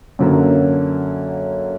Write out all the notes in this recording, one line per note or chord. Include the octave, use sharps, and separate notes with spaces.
F#2 D3 F#3 A#3